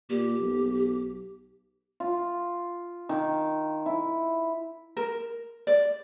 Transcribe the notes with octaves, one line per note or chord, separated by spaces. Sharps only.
A#2 G4
B1
F4
D#3
E4
A#4
D5